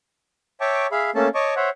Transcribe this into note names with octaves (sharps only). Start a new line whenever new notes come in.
C#5 E5 G5 A5 C#6 D6
G#4 E5 F5 B5
A3 A#3 C#4 A4 A5
C#5 D#5 A5 C#6 D6
C5 C#5 E5 F#5